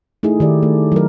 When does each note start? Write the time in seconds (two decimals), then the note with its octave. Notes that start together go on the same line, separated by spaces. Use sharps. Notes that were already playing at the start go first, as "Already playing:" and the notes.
0.23 A3 D#4 E4 G#4
0.40 D#3 G4 D5
0.63 A3
0.92 F#3 A#4